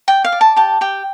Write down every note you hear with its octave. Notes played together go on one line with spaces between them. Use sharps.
D5 G5
F5
D5
A5
G4 A5
G4 G5